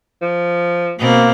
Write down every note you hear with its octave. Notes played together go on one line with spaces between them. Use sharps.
F3
B2 A#3 C4